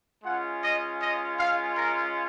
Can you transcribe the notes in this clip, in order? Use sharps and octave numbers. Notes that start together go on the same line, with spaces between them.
G#3 C#4 F4 F#5
D#5
D#5
F5
A#4